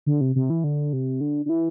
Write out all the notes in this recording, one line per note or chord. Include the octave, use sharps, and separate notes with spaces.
D3
C3
C3
E3
D3
C3
D3
D3
E3